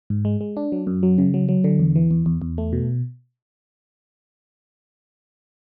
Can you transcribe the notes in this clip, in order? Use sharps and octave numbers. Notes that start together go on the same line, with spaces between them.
G#2
G#3
G#3
D4
F#3
F#2
F#3
C#3
F#3
F#3
D3
E2
E3
E2
E2
E2
A3
B2